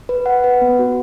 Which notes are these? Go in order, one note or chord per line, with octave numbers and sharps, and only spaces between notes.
B4
F#5
B4
B3
F#4